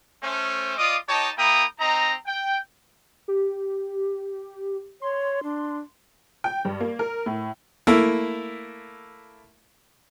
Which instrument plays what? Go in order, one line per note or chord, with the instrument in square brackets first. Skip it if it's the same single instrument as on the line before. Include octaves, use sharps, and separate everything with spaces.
[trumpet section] A3 C#4 C5
F4 D5 D#5 F5 D6 D#6
D#4 G4 C#5 D#5 A5
A#3 E4 G5 A#5 B5 D#6
C4 D#4 D#5 A#5
G5
[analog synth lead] G4
[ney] C#5 [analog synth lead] C6
[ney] D4
[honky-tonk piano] G5
G2
A#3
A#4
A2
[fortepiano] A3 A#3 E4